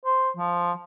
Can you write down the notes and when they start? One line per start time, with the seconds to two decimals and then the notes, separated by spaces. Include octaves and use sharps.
0.05 C5
0.37 F3